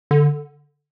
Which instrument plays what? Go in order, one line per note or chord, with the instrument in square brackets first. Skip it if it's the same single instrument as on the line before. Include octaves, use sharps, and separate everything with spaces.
[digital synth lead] D3